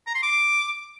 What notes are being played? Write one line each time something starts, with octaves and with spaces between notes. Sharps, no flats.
A#5
C6
D6